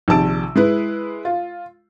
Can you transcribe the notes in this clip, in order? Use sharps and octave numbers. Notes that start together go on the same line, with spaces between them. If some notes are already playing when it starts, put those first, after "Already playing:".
A#1 C3 D#3 A5 E6 D7
G#3 E4 B4
F4